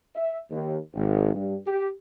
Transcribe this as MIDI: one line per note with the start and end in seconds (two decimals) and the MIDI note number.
0.15 0.37 76
0.50 0.77 39
0.94 1.33 32
1.33 1.54 43
1.66 1.89 67